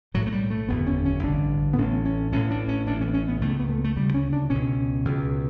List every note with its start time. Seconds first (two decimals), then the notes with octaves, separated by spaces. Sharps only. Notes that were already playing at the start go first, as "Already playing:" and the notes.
0.14 B1 A2 F#3
0.27 A3
0.32 G3
0.50 A3
0.68 F#1 E2 D3 B3
0.87 C#4
1.05 C#4
1.23 A1 G2 D3 D4
1.73 B3
1.78 A1 A2 C#4
2.05 C#4
2.32 A1 A2 C#4
2.51 D4
2.68 C#4
2.86 A1 A2 D4
3.01 C#4
3.08 B3
3.14 C#4
3.28 B3
3.41 C#2 C#3 A3
3.60 B3
3.69 A3
3.84 A3
3.96 D2 C#3 G3
4.14 C#4
4.33 D4
4.50 C#2 B2 C#4
5.05 C#2 B2